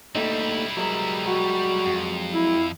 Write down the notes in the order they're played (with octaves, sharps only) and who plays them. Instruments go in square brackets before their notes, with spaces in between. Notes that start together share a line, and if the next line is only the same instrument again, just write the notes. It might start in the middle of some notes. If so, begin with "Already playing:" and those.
[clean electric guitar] D#2 A3 D#4 [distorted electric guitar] G3 E4
[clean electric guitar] F#3 G#3 A#4
[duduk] F#4
[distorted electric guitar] F2
[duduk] E4